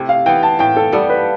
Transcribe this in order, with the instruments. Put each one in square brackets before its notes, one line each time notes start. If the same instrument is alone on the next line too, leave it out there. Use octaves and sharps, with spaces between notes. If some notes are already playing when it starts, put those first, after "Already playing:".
Already playing: [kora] C3 A3 C4 E4
[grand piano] F5
[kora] E3 B3 [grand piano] G5
[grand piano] A5
[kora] A2 [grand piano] G5
[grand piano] A4
[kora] G3 B3 [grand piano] A4
[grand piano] B4